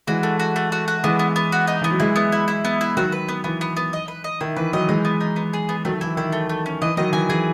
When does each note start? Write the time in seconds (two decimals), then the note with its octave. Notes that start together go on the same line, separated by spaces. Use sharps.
0.07 E3 G#3 F#4
0.23 A3
0.40 F#4
0.56 A3
0.72 F#4
0.88 F#4
1.03 E3 G#3 B3
1.19 B3
1.36 B3
1.52 F#4
1.67 D#4
1.82 E3 B3
1.91 F#3
2.00 E3 G#3 E4
2.16 B3
2.32 E4
2.48 E4
2.65 B3
2.81 E4
2.97 D#3 F#3 F#4
3.12 B4
3.29 B3
3.44 E3 B3
3.61 B3
3.77 B3
3.93 D#5
4.08 B4
4.24 D#5
4.41 D#3 E4
4.56 E3 B4
4.73 D#3 F#3 D#5
4.88 E3 G#3 D#4
5.05 B3
5.21 D#4
5.36 B3
5.53 G#4
5.69 B3
5.85 D#3 F#3 A3
6.01 E3 E4
6.17 D#3 E4
6.32 A3
6.49 A3
6.66 C#4
6.82 E3 D#5
6.97 D#3 F#3 D#5
7.13 E3 G#5
7.29 E3 G#4